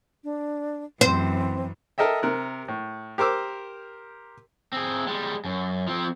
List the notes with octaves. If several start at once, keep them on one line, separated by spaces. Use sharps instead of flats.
D4
F#2 E3 C4 C5
A4 A#4 D#5 E5 G5
C3 A#4 F#6
A2
G4 A#4 C5 D6 E6
C4 G#4
G3 G#3
F#2
F3 C4